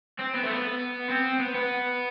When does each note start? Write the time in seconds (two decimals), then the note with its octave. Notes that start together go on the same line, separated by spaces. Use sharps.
0.19 C4
0.35 B3
0.43 A3
0.51 B3
1.10 C4
1.40 B3
1.55 B3